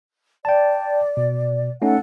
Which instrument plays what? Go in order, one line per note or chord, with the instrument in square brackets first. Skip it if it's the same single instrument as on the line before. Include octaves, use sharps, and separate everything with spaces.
[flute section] D5 [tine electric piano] G5 A5
[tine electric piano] B2
[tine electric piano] A3 C#4 D#4 [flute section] A4 F#5